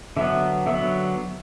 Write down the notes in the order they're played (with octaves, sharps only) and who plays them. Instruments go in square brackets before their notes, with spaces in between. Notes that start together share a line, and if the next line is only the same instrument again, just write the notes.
[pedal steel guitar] D3 F#3 B3 [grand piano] E5
[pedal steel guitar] D3 F#3 B3 [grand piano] E5